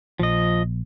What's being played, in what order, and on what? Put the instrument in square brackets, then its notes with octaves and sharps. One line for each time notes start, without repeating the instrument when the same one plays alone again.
[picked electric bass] A#1 [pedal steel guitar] F3 D#5